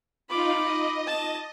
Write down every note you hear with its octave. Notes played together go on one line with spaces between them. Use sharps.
D#4 F4 B5 D6
D#5
A5